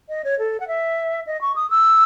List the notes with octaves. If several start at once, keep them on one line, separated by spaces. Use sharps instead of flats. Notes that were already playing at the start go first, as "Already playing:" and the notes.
D#5
C#5
A4
F#5
E5
D#5
C#6
D#6
E6